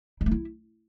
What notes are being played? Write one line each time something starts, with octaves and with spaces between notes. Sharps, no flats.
G3
A3
E4